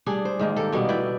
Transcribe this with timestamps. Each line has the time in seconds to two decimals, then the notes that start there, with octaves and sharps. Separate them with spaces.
0.06 G3 D4 G#4
0.25 C5
0.39 G#2 D#3 A#3
0.56 A#3 G4 A4
0.73 B2 G3 A#3 B3
0.89 E4 B4 D5 G5